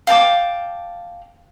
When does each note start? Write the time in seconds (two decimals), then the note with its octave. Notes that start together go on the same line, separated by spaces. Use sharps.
0.07 F5 G5 A5 D6